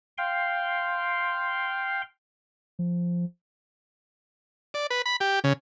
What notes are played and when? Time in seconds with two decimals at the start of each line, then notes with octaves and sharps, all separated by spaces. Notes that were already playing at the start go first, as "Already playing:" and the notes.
0.18 F5 G5 C6
2.79 F3
4.74 D5
4.90 B4
5.06 B5
5.20 G4
5.44 C#3